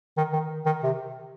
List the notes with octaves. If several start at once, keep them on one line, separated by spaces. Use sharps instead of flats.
D#3
D#3
D#3
C3